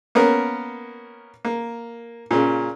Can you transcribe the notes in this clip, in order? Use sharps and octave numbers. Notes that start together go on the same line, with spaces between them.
A#3 B3 C#4 A#4
A#3
A#2 C#3